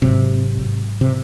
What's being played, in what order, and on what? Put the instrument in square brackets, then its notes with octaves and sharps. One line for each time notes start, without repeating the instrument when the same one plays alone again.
[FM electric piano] G#1 G#2 F#3 [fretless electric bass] C3
[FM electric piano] G#1 G#2 F#3
[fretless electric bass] C3